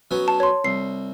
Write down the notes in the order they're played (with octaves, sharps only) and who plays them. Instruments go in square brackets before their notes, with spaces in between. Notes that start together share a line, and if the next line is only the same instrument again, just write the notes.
[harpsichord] F#3 B3 C#4
[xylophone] A5
C#5 C6
[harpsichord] C2 [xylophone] C7